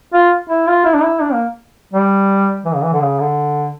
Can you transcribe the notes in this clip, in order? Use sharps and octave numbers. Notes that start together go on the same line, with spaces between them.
F4
E4
F4
E4
D4
E4
D4
A#3
G3
E3
C#3
E3
D3
C#3
D3